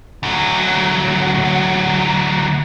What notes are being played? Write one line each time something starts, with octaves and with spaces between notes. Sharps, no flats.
D2 F#3